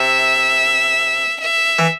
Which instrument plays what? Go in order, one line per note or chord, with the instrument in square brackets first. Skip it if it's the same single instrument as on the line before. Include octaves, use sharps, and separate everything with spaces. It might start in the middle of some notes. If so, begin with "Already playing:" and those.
Already playing: [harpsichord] C3 [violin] E5
[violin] E5
[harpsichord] E3